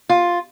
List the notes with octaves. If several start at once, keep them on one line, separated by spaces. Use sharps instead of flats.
F4